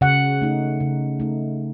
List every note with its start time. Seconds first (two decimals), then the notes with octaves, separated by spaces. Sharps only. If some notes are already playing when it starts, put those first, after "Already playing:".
0.01 C#3 F#5
0.41 A3 D#4
0.80 C#3
1.20 A3 D#4